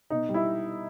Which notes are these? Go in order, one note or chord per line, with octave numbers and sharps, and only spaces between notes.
B2 D#4
G3
E4